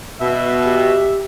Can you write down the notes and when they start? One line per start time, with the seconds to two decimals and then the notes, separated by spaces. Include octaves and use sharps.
0.21 B2 E5
0.66 G4